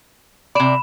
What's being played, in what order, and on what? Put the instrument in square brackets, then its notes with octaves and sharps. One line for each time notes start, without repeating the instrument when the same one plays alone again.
[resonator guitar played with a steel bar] C3 D5 [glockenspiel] B5 E7